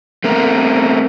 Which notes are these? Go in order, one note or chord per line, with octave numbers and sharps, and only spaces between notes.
A3 C4 A#4